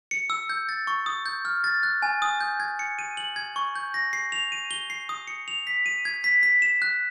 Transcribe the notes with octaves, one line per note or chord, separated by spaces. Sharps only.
C#7
E6
G6
A6
C#6
D#6
G6
F6
A6
F#6
G#5
D#6
G6
G#6
C#7
D#7
F#7
G#6
C#6
G6
A#6
C7
F7
D#7
G7
C7
D#6
C#7
F7
B6
D#7
G#6
B6
B6
E7
F#6